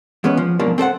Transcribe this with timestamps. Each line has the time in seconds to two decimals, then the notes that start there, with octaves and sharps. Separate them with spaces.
0.24 E2 G#3 B3 C#4
0.37 F3
0.60 G#2 B2 F3 F#3 A#3 D4
0.78 C4 A4 C5 F#5